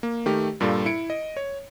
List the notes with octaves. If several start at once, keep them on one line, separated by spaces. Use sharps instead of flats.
A#3
D#3 A3 G4
G2 A#2 G3 F4 A4
E4 C#7 D7
D#5
C#5